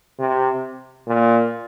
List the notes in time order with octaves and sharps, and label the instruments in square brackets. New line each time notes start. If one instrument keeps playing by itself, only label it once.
[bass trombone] C3
A#2